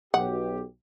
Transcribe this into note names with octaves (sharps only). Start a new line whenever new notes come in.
B1 G4 F#5